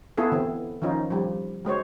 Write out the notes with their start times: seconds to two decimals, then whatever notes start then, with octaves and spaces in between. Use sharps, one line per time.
0.17 B3 E4 F4 G#4 A4
0.32 D3 E3 C4
0.82 D#3 F3 C#4 D#4 F4
1.10 F3 G3
1.65 F#3 G#3 C5 C#5